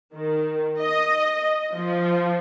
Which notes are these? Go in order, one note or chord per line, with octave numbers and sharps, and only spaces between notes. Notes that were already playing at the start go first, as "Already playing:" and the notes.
D#3
D#5
F3